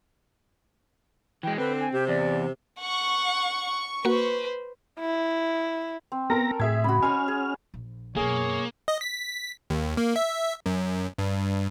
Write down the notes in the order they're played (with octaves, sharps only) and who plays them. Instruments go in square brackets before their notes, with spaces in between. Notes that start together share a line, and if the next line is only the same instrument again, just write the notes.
[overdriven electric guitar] E3 G#3 [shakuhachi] G5
[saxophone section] D3 [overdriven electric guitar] C4 [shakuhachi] B4
[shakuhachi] G#5
[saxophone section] C3 [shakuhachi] G4
[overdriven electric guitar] E2 [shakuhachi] D5
[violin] F#5 [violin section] C#6
[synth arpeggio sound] A#3 F#4 [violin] B4 C5
[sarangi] E4
[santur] C4
[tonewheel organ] B3 A#6 [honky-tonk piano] A4 A#4 A#5
[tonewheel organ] A2 [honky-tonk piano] G#4 E5 G#6
[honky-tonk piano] C#3 [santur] F#4 B5
[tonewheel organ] C#4 F6 [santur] C5 C#5 D#5 [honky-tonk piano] G#5
[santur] G#4
[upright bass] A#1
[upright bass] F#2 B2 [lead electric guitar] A#3 [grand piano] G#4 [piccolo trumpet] C#5
[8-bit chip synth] D#5
B6
D#2
A#3
E5
F#2
G2